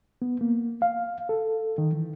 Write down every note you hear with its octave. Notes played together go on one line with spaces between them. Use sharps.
B3
A#3
F5
A4
D#3
E3